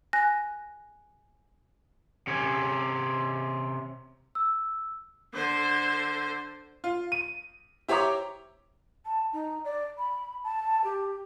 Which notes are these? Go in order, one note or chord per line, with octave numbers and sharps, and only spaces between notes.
G#5 F#6 A#6
C3 C#4
E6
D3 C5
F4
D#7
E4 G4 C5 C#5 A#5 D6
A5
D#4
D5
B5
A5
G4